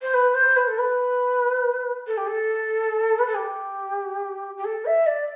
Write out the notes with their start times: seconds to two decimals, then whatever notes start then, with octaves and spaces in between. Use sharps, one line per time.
0.01 C5
0.13 B4
0.34 C5
0.56 B4
0.67 A4
0.78 B4
2.07 A4
2.17 G4
2.27 A4
3.18 B4
3.26 A4
3.34 G4
4.57 G4
4.64 A4
4.85 E5
5.06 D5